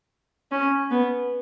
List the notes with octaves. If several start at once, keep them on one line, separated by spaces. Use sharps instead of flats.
C#4
B3